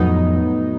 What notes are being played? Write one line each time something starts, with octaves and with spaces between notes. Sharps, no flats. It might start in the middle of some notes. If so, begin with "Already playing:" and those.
Already playing: F2 A2 F#3 B3 D#4